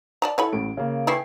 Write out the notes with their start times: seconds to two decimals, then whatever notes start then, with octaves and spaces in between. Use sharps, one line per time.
0.22 D5 A5 A#5
0.38 E4 A4 C#5 G#5 B5
0.53 A1 A2 D7
0.77 C#3 A#3
1.07 E3 A3 E4 G5 G#5 C7